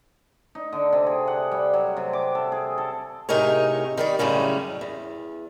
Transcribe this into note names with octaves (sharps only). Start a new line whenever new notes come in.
D#4
D3
C3
G#4
F#5
G3
F#3
C3
D6
A4
G#4
A4
A2 C3 D#4 G#4 A#4 C#5
D#3 G3 D5
F#2 A2 C#3 G3 C#4
E2